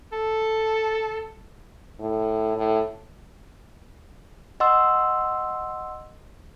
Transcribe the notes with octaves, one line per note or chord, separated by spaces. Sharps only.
A4
A2
A2
D#5 F#5 C6 E6